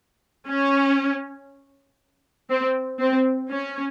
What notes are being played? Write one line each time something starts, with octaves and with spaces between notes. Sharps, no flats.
C#4
C4
C4
C#4